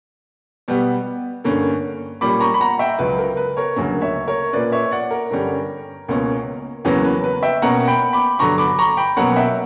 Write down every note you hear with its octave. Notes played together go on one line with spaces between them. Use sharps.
B2 G3 B3
G2 D3 A#3 C#4
A#2 G3 A#3 C#4 B5 D6
A#5 C#6
B5
F#5 A#5
E5 G5
C#2 C#3 F#3 B4
A#4
B4
A#4 C#5
D2 C#3 F#3 A#3 C#4
C#5 E5
A#4 C#5
A#2 A#3 C#4 B4 D5
C#5 E5
D5 F#5
A#4
G2 D3 G3 C#4
C#2 B2 A#3 C#4
E2 C#3 F#3 A#3 C#4 B4
B4
B4
E5 G5
B2 A#3 C#4 F#5 A#5
G5 B5
B5 D6
G2 D3 F#3 A#5 C#6
B5 D6
A#5 C#6
G5 B5
B2 F#3 A#3 C#4 F#5 A#5
E5 G5